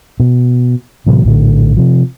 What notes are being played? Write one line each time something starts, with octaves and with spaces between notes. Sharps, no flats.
B2
A2 C3 E3 F#3
A#1 A2 D3
C3 F3